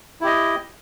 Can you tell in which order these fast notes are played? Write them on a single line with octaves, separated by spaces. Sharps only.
E4 G4 D#5